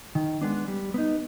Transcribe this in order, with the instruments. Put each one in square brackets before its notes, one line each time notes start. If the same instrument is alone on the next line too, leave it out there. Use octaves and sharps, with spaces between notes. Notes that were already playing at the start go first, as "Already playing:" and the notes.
[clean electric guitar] D#3
G#3 B3 D4
G3
B3 D#4